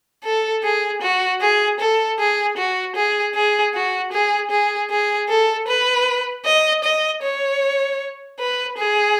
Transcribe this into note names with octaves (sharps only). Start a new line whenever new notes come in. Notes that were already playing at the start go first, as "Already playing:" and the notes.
A4
G#4
F#4
G#4
A4
G#4
F#4
G#4
G#4
F#4
G#4
G#4
G#4
A4
B4
D#5
D#5
C#5
B4
G#4